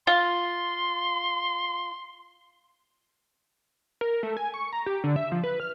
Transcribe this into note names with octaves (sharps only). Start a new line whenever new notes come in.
F4 C6
A#4
A3
G#5
C#6
A#5
G4
D3
E5
F3
B4
F6